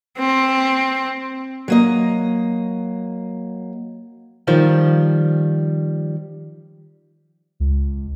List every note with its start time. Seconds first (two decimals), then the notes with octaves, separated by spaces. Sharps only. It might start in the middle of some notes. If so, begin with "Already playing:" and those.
0.18 C4
1.68 F#3 A#3 D#5
4.47 D#3 F3 G3
7.60 C#2